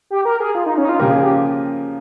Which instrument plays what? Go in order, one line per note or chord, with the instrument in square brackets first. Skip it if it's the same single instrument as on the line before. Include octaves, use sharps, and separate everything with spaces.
[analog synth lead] G4
A#4
G#4
F4
D#4
C#4
D#4
F4
[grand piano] C#3 F3 A#3 F4 A#4 [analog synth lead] G4
[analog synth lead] G#4
G4